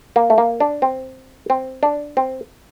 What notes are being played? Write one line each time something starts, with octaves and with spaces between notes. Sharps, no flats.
A#3
A3
A#3
D4
C4
C4
D4
C4